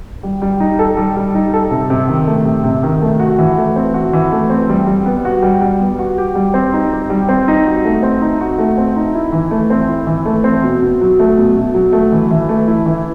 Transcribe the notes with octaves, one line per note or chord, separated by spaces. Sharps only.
G3
G3
D#4
A4
G3
G3
D#4
A4
C3
C3
D#3
A3
C3
C3
D#3
A3
F#4
E3
A3
C4
F#4
E3
A3
C4
G3
G3
B3
F#4
G3
G3
B3
F#4
G4
G3
C4
D#4
G4
G3
C4
D#4
F#4
A3
C4
D#4
F#4
A3
C4
D#4
E4
E3
A3
C4
E4
E3
A3
C4
B2
B2
F#3
A3
B2
B2
F#3
A3
E3
E3
A3
E4
E3